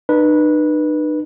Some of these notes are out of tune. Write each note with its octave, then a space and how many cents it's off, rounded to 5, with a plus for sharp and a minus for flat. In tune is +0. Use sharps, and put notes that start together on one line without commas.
D#4 -45 B4 -15